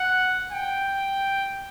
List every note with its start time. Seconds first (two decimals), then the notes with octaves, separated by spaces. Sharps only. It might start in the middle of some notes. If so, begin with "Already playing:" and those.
Already playing: F#5
0.52 G5